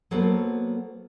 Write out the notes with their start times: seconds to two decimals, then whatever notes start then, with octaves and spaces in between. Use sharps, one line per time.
0.11 F#3 A#3 B3 A4 C5 F#5